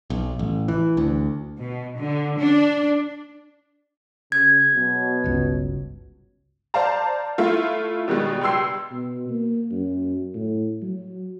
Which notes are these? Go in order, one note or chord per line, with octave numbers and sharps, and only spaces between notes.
B1
A1
E3
D2
B2
D3
D4
C#3 G#6
B2 F#3
G1 C#2
C5 D5 F5 A5 A#5
A3 E4 F4
B2 D#3 G3 G#3
C#2 G3 C6 E6 C7
B2
A#3
F#2
A2
F#3